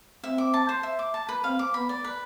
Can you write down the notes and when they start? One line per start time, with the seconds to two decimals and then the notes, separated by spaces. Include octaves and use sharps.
0.24 C4 E5
0.38 D6
0.54 A5
0.69 C5
0.83 E5
0.99 D6
1.14 A5
1.29 B4
1.44 C4 F5
1.59 D6
1.74 B3 B5
1.89 D5
2.04 B4